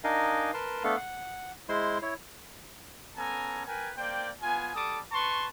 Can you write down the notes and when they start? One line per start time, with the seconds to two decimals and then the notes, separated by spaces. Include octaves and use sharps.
0.04 D4 D#4 A#4 D#5 F5 G#5
0.54 A#4 B4 A5 C6
0.84 A3 B3 D4 A4 F5
0.97 F#5
1.69 G#3 E4 C5 C6
2.02 E4 C#5
3.16 B3 C#4 A4 G#5 A#5
3.66 A#4 B4 G5 G#5
3.96 A#3 C5 D5 G5
4.41 B3 F4 G#5
4.74 G3 A4 A5 D6 D#6
5.12 B4 A5 C6 C#6